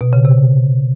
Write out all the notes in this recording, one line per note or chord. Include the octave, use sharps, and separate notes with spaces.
B2
C#3
C3